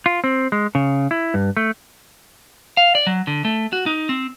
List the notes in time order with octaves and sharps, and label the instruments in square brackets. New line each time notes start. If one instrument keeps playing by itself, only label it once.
[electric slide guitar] F4
C4
G#3
C#3
E4
G2
A3
[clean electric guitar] F5
D5
F#3
D3
A3
F#4
D#4
C4